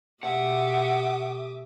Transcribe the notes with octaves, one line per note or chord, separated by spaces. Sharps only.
B2 A3 G4 E5 F#5 D6 D#6